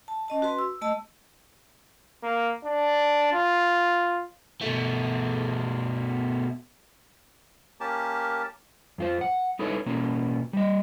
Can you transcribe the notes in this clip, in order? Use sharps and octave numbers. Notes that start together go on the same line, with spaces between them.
A5
C#4 D#5 A5
F#4 B4 C6
E6
A3 D#5 A5 E6
A#3
D4
F4
B2 A3
A#3 C#4 G4 A#4 A5
F2 F4 C5
F#5
D#4 E4 A4 B4 C#5
B2 A#3 C#4
G3 D#5